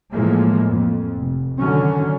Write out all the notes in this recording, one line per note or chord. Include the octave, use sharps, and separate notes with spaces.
A2 E3 F3 G#3 A#3
F2
F1
D3 D#3 F#3 C#4